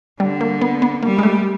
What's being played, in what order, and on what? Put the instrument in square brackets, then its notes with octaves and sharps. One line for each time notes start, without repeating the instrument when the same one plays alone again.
[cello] D3 [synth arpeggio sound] G3
[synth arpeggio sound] A#3
B3
B3
[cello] G3 [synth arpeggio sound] A#3
[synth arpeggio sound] G#3
A3